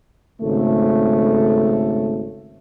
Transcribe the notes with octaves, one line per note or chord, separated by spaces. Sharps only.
G#1 C#3 A3